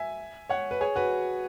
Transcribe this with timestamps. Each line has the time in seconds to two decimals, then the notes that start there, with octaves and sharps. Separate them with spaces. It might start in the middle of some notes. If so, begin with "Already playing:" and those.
Already playing: E5 G#5
0.49 C#5 F#5
0.71 B4
0.81 G#4 C#5
0.96 F#4 B4